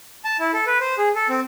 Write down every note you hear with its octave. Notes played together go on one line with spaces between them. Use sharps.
A5
E4
A4
B4
C5
G#4
A4
C4